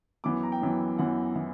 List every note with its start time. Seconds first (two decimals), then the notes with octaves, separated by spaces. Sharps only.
0.24 F#2 E3 B3 D6
0.43 A#5
0.52 G5
0.62 F#2 E3 B3
0.98 F#2 E3 B3 F#5
1.35 E3 B3